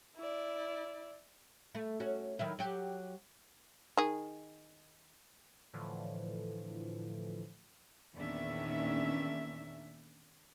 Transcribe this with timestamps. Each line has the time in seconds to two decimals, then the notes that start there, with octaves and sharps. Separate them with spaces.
0.17 E4 D5
1.75 A3
2.00 C#4 F#4
2.39 D#3 F#3 E4
2.59 F#3 F#4 G4
3.97 D#3 G#4
5.73 A2 D3 E3 F3
8.16 E2 A#2 D#3 C#4 D4 E5